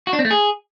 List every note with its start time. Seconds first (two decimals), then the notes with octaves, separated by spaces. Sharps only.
0.07 F#4
0.13 D4
0.19 C4
0.25 A3
0.31 G#4